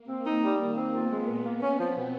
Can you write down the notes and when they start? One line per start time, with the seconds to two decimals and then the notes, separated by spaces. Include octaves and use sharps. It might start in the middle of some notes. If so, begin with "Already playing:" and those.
Already playing: A#3
0.08 C4
0.26 D#4
0.43 G3
0.60 D#3
0.77 C4
0.94 B3 F4
1.11 G#3
1.28 A#2
1.45 A#3
1.62 C4 C#4
1.79 F3
1.96 B2